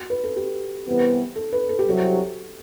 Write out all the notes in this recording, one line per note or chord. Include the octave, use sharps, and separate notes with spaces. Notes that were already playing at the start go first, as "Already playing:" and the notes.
Already playing: F#4
B4
A4
G4
C2 C3 E3 B3
A4
B4
A4
G4
C2 C3 F#3 A4